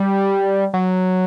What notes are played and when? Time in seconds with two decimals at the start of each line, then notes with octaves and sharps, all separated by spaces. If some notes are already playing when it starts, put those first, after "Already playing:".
Already playing: G3
0.74 F#3